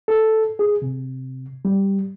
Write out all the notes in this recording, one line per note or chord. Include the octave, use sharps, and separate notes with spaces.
A4
G#4
C3
G3